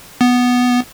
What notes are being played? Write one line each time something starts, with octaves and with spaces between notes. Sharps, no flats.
B3